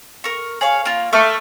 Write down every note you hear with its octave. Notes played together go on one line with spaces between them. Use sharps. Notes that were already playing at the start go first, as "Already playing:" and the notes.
A#4 C#6
G#4 C#5 F5
A#3 F4
A3 C#6 D6 F6